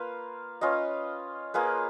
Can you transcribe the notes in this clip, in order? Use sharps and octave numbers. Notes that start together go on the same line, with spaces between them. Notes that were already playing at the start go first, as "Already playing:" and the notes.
Already playing: A#3 F4 B4
C#4 F4 B4 D#5
A#3 F4 G#4 B4